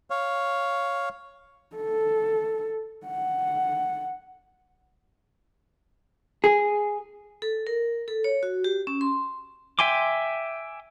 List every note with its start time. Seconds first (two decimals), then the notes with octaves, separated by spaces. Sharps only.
0.10 C#5 F5
1.76 A4
3.07 F#5
6.44 G#4
7.42 A4
7.67 A#4
8.08 A4
8.24 C#5
8.43 F#4
8.64 G4
8.87 C#4
9.01 C6
9.79 E5 G5 G#5 C6 D6